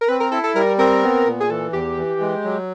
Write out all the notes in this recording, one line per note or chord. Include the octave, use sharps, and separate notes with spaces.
A#4
C4 B4
A#4
E4 A4
A4
G3 A#4
C4 A#4
B3
A#2
G#4
E3 A4
E2 G4
E3
G#3
F#3